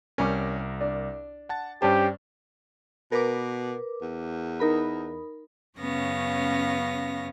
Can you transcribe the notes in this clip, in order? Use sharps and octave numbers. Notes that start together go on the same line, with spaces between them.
C2 G3 C#4 A#4
D4
F#5 A5 A6
G2 C#4 D4 G4 C5 A5
B2 A#4 B4 D6
E2
D#4 A#4 B5
F#2 C#3 B3 C#4 F5 A#6